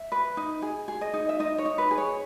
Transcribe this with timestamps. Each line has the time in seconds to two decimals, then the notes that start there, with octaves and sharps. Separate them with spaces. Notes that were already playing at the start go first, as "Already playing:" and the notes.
Already playing: E5
0.12 B4
0.37 D#4
0.62 G#4
0.88 G#4
1.01 D#5
1.14 D#4
1.29 E5
1.40 D#4 D#5
1.58 C#5
1.65 D#4
1.78 B4
1.91 G#4
1.98 C#5